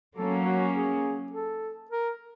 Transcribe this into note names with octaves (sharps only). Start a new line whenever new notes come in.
F#3 A#3 C#4 A4
F#4
G#4
A4
A#4